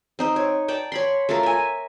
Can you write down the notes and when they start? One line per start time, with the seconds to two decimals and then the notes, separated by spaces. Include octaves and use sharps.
0.19 C4 D#4 C5
0.36 C#5
0.68 D5 G5 A5
0.92 C#5 B5 C6
1.29 A3 F4 A4 A#4
1.43 E5 G#5